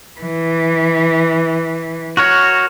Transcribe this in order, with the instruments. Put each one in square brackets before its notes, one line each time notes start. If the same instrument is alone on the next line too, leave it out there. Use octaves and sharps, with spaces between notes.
[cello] E3
[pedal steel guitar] F#4 A#4 C#5